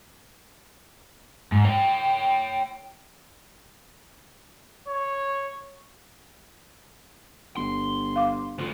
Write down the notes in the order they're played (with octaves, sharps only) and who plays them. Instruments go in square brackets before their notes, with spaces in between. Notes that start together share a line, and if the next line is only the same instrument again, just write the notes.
[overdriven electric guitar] G#2
C#5 G5
[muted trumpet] C#5
[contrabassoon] G1 [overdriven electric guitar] C6
[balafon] F5 D6
[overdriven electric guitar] D2 F4